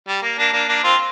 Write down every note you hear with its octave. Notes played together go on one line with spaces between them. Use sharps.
G3
A#3
A#3 D4
A#3 D4
A#3 D4
C4 F4